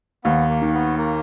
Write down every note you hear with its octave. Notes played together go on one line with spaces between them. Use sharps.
D#2 B3
A#3
D#3
B3
A#3